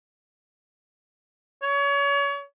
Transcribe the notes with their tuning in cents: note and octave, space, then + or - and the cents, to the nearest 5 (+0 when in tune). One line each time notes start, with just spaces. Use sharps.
C#5 +30